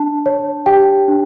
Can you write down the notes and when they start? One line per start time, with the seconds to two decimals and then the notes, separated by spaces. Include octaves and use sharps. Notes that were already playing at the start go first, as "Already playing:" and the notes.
Already playing: D4 A5
0.26 C#5
0.66 G4 G5
1.08 D4